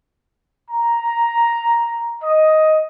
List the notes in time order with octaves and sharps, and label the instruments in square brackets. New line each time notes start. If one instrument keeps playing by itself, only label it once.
[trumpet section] A#5
D#5